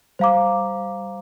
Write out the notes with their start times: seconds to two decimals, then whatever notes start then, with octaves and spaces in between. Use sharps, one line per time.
0.19 G3 C5 F5 A#5 D6